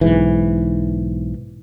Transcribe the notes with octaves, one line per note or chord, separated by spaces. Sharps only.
B1 G#2 E3